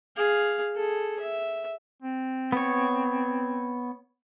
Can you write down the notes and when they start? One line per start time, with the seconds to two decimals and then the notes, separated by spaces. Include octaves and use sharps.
0.17 G#4 F5
0.76 G#4 A4
1.20 E5
2.02 C4
2.52 B3 C#5